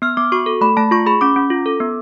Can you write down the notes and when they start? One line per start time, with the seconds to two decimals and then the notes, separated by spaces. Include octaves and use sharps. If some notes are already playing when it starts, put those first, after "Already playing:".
0.02 B3 F6
0.17 B3 D6
0.32 F#4 C#6
0.46 A4
0.61 A3 B5
0.77 A3 A5
0.91 F4 C#6
1.06 G#4 B5
1.21 C#4 D6
1.36 C#4
1.50 F4
1.66 A4
1.80 B3